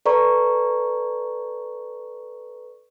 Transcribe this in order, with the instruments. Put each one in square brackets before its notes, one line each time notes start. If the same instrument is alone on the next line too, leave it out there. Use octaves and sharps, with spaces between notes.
[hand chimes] A4 B4 D5 A#5 C#6